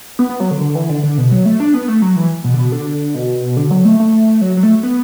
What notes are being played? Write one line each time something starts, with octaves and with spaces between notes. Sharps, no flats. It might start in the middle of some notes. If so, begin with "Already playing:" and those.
B3
B3
F#3
D3
D3
E3
D3
D3
B2
F#3
A3
D4
B3
A3
F#3
E3
B2
D3
B2
D3
B2
D3
F#3
A3
A3
F#3
F#3
A3
B3